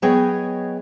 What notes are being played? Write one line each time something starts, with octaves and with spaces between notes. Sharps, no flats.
F#3 B3 G#4 C#5 D#5 G5